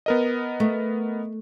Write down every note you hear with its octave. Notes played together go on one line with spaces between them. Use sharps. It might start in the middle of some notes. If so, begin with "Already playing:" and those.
B3 A#4 D#5
A3